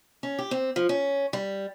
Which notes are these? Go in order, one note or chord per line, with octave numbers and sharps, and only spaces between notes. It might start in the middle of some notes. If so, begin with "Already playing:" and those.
C#4
G4
C4
F3
C#4
G3